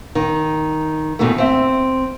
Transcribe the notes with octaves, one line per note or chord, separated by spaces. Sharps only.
D#3
G#2 B2 D#3 E3 A3
C4 E5